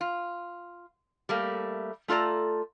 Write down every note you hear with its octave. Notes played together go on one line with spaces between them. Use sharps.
F4
G3 A3 A#3
A3 F4 A4 D5 A#5